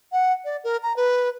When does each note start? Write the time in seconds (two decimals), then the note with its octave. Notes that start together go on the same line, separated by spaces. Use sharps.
0.12 F#5
0.45 D5
0.64 A#4
0.83 A#5
0.96 B4